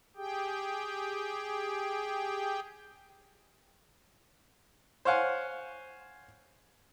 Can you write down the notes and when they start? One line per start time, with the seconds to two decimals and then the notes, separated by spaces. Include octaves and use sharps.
0.17 G4 G#4 G5
5.05 C5 C#5 F5 F#5 G#5